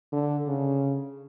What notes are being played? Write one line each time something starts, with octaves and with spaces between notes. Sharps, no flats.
D3
C#3